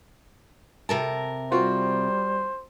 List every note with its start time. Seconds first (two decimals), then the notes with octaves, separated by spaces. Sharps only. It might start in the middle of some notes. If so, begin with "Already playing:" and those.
0.89 C3 A#4 A5
1.51 G3 C4 F4 F#4 C5